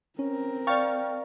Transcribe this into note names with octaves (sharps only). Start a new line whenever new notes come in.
C4 C#4 A#4
D5 F5 G5 C#6 F6 A6